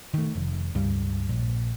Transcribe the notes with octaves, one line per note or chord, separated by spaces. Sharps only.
D#3 A3
F1
C#2 G2 G3
A#1